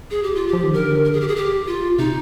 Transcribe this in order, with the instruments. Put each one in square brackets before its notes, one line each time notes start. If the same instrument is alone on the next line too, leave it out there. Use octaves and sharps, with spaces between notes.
[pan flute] G#4
G4
F4
G4
[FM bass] F3
D#3
[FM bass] D3 [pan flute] A#4
[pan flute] A#4
G#4
G4
G#4
G4
F4
[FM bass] C3 [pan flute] D#4